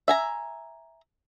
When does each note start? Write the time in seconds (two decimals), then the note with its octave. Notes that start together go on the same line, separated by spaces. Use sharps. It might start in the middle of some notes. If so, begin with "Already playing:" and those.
0.08 E5 G#5 A#5